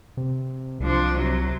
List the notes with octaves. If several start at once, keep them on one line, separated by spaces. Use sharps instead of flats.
C3
C2 F3 D4
C3 F#3